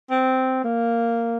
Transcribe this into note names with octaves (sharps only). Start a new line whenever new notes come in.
C4
A#3